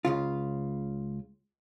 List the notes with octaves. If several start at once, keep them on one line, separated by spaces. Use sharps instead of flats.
C#2 C#3 F4